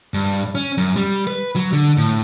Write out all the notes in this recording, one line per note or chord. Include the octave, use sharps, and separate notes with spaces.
G2
C#4
F#2
G3
B4
F#3
D3
A2